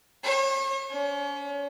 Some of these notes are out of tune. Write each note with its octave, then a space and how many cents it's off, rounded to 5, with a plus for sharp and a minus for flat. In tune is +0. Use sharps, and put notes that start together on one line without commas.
C#5 -40
C#4 +35